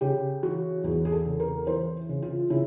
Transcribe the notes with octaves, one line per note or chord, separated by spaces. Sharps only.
C#3 G4
E3 F#4
E2 G#4
G#4
A4
C#3
A#4
E3 C5
C#3
F4
C#3 E4